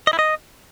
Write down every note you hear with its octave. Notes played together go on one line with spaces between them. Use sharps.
D#5
E4
D#5